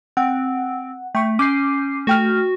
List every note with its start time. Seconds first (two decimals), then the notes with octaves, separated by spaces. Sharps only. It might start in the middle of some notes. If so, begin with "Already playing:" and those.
0.17 C4 F#5
1.15 A3 G5 C#6
1.39 C#4 D6 G6 C7
2.07 A3 F#4 G5 F6